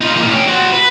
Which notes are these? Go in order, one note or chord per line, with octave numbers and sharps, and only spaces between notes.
D#4 F4
A2 A#3
C#4 G5
F#4 C5
B4